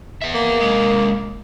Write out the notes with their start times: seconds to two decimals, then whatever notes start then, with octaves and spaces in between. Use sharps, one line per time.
0.22 B3 E5
0.34 A#3
0.60 C3 G#3